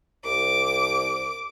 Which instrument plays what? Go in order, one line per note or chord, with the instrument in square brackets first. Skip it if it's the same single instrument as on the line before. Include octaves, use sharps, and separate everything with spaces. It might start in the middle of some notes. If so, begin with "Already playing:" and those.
[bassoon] C2 [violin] D6